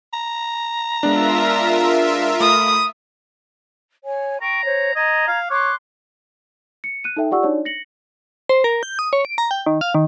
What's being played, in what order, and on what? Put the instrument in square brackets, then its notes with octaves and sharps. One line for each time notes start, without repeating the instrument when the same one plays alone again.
[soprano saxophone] A#5
[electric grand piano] G#3 B3 D4 [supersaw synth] F4 A#4 E5
[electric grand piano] A3 [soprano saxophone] B5 [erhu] D#6
[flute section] C#5 G#5
[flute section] G5 C#6 [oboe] A#5
[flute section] C5 C#5
[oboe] D#5 [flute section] A#5 G#6
[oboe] F5
[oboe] C#5 [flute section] C6 D6 F#6
[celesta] C#7
F#6 D#7
D#4 A4 E5 G5
F4 G4 D5 F#5 C#6 E6
D4 D#4 F#4 C#5 D5
A#6 C#7 F#7
[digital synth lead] C5
A#4
G6
D#6
C#5
D7
A#5
G5
D#3
F5
D#3